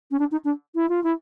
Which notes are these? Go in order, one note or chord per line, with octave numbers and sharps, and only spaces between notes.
C#4
D4
D#4
D4
E4
F4
E4